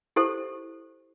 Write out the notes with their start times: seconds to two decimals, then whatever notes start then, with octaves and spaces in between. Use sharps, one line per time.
0.16 E4 G4 A4 C5